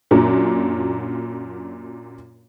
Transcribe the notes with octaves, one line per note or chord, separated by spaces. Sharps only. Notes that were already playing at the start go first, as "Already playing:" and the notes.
F#2 A#2 F#3 D4